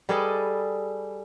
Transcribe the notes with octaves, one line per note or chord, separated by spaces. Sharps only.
G3 G#4 A4 B4 D5 D#5